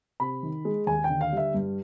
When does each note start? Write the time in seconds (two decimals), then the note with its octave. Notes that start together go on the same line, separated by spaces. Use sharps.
0.20 C3 B5
0.43 D#3
0.65 G#3
0.87 D#2 G#5
1.04 G5
1.10 D3
1.21 F5
1.32 G3 E5
1.54 G2